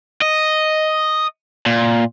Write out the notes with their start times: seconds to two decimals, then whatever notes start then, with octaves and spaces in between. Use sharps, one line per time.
0.22 D#5
1.66 A#2